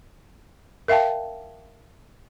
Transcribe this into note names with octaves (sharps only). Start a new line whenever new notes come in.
A#4 E5 F5 G5 A5